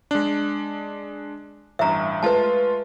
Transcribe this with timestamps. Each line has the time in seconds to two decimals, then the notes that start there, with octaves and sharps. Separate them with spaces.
0.11 G#3 D4
1.79 A1 G2 E5 A#5
2.23 G#3 A3 F4 B4 A5